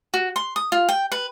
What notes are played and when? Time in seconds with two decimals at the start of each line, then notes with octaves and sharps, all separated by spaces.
0.14 F#4
0.36 C6
0.56 D#6
0.72 F4
0.89 G5
1.12 B4